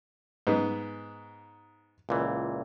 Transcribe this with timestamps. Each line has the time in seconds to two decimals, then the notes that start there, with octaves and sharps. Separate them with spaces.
0.47 G#2 B3
2.09 C#2 A#2 E3